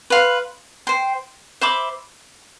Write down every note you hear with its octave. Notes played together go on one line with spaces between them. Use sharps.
B4 F5 C6
C5 G5 C6
C5 E5 B5 D6